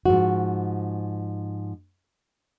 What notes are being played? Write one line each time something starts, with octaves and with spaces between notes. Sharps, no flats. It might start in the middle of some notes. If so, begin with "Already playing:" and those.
G#2 F3 F#4